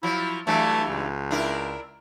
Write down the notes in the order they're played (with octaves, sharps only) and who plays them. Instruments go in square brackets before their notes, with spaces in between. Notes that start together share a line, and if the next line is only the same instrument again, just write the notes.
[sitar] F3 F#3 [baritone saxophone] E4
[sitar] G2 E3 F#3 [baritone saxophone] A3
[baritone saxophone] C#2
[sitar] D4 E4 A#4